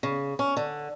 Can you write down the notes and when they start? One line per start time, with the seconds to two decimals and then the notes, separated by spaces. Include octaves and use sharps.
0.03 C#3
0.39 C#4
0.57 D3